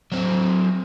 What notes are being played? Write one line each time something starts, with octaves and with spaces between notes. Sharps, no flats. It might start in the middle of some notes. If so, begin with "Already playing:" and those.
F#3 C4